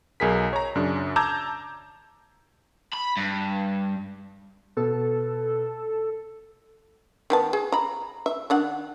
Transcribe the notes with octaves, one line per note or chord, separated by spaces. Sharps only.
B1 G#4 A#4 B6
C#5 A#5
F#2 C#3 D4
A5 A#5 D6 E6 G6 G#6
B5
G2
B2 A4
D#3 B3 A5
G#4
A#5 B5
E5
D#3 D4 F#5